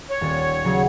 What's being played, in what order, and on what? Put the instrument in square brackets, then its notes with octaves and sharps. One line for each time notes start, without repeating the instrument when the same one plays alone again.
[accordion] C#5
[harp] D#1 A6
C#3 F#3 G#4